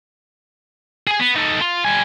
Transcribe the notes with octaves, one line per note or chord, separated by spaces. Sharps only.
G#4 G#5
B3
D#4 A4
F4
G3 G#5